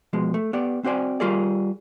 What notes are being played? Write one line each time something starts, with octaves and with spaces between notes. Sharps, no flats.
B2 F3 G#3
A3
B3 G4 D5
C4 F#4 C5 D5 G#5
G3 F4 G4 G#4 A#4 D5